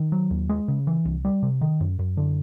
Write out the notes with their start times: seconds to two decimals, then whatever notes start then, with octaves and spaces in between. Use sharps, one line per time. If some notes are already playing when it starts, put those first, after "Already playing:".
Already playing: D#3
0.12 F#3
0.31 D#2
0.49 G#3
0.68 C#3
0.87 E3
1.05 C2
1.25 G3
1.43 C3
1.61 D#3
1.80 F#2
1.99 F#2
2.17 D3